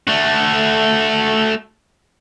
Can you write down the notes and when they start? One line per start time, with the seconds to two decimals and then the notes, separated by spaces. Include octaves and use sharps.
0.07 A3 F#4